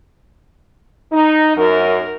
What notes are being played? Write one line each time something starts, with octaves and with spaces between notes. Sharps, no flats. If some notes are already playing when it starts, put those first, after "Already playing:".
D#4
F#2 A#4